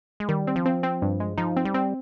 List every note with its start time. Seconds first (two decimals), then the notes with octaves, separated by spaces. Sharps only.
0.20 G#3
0.29 D#3 G3
0.47 C4
0.56 F3
0.66 C4
0.83 C4
1.02 G2
1.20 G#3
1.37 F3 D#4
1.57 C4
1.65 G3
1.74 C4